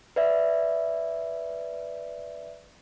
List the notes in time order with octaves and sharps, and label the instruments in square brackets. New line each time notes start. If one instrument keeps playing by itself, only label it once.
[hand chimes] B4 D5 E5